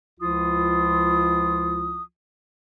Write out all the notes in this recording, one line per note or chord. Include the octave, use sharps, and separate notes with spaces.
C#2 F3 E4 F4 D#6